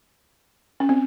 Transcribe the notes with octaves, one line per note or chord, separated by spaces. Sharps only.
C#4
C4